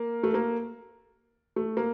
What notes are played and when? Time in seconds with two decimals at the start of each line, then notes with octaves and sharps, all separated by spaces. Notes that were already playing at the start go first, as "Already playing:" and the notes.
Already playing: A#3
0.23 A3
0.34 A#3
1.56 A3
1.77 A#3